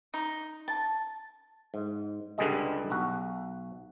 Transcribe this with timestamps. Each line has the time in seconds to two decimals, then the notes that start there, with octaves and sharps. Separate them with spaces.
0.14 D#4
0.68 A5
1.74 G#2
2.38 C#2 G2 D3 G3 G#3 D#5
2.90 B1 F#4